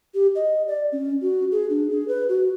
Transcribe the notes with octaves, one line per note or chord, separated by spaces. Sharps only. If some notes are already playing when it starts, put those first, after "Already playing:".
G4
D#5
D5
C#4
F#4
G#4
D4
G#4
B4
F#4